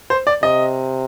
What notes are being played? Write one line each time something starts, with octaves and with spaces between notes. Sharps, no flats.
C5
D5
C3 D#5